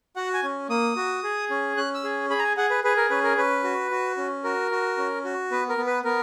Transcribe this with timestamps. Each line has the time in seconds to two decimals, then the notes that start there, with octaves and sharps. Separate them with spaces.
0.16 F#4 F#5
0.34 G#5
0.43 C#4
0.69 A#3 D#6
0.96 F#4
1.24 G#4
1.50 C#4
1.77 C#4 F#6
1.94 E6
2.04 G#4
2.30 G#4 B5
2.39 A#5
2.43 G#5
2.57 G#4 F#5
2.70 B4
2.84 G#4 B4
2.97 A#4
3.10 C#4 B4
3.24 A#4
3.37 C#4 B4
3.64 F#4
3.91 F#4
4.17 C#4
4.44 F#4 A#4
4.71 F#4
4.97 C#4
5.25 F#4
5.51 B3 B4
5.69 A#4
5.78 B3
5.87 B4
6.05 B3 A#4